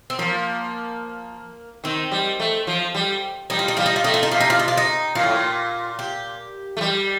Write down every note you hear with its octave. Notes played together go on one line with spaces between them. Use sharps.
C4
F3 A#3
D#3 C4
G3
A3
F3
G3
G3 D#4
F4
D#4
G3 F4
D#4
F4
A3 D#4
F4
D#4
C3 F4
D#4
F4
D#4
F4
D#4
A#2 F4
A2
A#2
G4
A3
G3